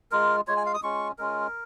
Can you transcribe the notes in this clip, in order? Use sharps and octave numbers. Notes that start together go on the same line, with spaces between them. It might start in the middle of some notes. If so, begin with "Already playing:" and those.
G#3 F4 A#4
G#3 F4 C#5
G#5
F5
D#6
G#3 C#4 F4 C#6
G#3 C#4 F4 A#4